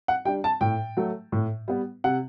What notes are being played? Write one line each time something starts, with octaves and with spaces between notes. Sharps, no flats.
F#5
G3 D4 G5
A5
A2 G5
F#3 A3
A2
G3 B3
C3 F#5